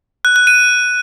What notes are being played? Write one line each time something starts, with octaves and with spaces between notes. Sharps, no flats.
F#6
F#6
D#7